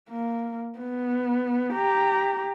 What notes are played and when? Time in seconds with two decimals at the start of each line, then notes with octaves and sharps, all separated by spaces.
0.10 A#3
0.79 B3
1.74 G4 A#5